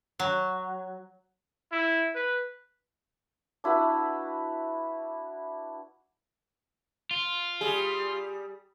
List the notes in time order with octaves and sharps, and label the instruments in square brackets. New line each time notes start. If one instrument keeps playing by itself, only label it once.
[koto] F#3
[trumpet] E4
B4
[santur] D4 E4 F#4 B4
[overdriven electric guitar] F4
[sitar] G3 G#4